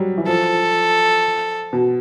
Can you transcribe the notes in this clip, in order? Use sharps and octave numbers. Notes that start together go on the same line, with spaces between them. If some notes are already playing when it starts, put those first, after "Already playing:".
Already playing: F#3 G3
E3
F3 A4
B2